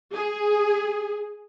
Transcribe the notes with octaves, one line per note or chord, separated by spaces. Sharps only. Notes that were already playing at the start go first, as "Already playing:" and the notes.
G#4